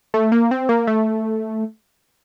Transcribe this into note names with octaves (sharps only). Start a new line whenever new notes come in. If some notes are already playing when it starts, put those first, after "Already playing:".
A3
A#3
C4
A#3
A3